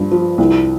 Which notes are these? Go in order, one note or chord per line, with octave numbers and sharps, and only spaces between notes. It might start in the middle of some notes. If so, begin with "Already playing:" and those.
Already playing: G2 F3
F3
C2